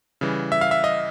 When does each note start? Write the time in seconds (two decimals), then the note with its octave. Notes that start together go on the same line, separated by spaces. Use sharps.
0.21 C#3 E3 G3
0.52 E5
0.61 F5
0.71 E5
0.84 D#5